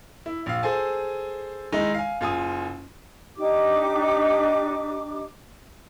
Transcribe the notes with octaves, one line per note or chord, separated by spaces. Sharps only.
E4
A#1 F5
G#4 A4 C5 G#5 A5
D#3 G#3 D#4 E4
F5 G#5
F#1 F4 G#5 D#6
D4 D#4 G4 D6